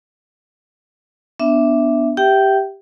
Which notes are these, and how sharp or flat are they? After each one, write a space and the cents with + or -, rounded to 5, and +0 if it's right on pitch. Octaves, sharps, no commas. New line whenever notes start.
B3 +0 D4 +0 E5 +0
G4 +0 E5 +15 G5 -20